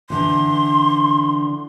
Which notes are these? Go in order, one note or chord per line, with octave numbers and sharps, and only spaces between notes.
D3 E3 C6